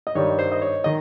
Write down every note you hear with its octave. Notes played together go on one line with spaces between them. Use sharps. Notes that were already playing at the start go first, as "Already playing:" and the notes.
D#5
G2 D#3 G3 C#5
C5
D#5
C#5
D#3 D#5